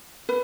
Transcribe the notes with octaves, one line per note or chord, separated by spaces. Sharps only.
B4